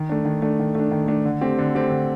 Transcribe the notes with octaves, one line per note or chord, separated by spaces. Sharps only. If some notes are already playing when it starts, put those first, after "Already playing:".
Already playing: D#3
A3 D4
D#3
A3 D4
D#3
A3 D4
D#3
A3 D4
D3
A3 C4 G4
D3
A3 C4 G4
D3